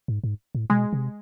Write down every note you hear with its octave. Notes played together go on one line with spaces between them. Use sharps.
G#2
G#2
A2
B2 G#3
C3